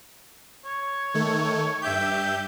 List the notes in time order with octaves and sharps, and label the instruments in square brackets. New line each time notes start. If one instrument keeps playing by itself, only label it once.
[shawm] C#5
[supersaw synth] D#3 A3
[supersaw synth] G2 E5 G6 [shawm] G4